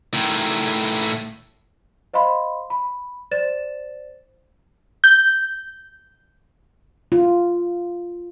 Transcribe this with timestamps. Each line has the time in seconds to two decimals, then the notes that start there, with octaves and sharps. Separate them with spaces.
0.13 A2 D#3
2.14 C5 D#5 F5 B5 C6
2.70 B5
3.31 C5 D5 A6 E7
5.04 G6
7.12 F4